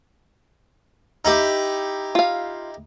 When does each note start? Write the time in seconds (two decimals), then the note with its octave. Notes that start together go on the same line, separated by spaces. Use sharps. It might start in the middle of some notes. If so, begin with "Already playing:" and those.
1.25 D#4 E4 G4
2.15 F4 F5